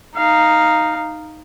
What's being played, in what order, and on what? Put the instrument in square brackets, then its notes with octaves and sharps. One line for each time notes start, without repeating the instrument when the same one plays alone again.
[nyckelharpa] D#4 F5